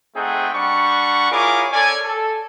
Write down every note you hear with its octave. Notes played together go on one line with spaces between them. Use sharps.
A3 C4 D#4 G#4 F#5 G5
G3 D4 F#5 C#6
E4 F4 G#4 A#4 C#5 D6
C#4 A4 C#5 D5 G#5
A4